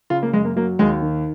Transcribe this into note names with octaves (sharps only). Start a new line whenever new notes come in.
C#3 F4
A#3
F#2 G#3
A#3
F#3 A#3
D#2 G#3
D#3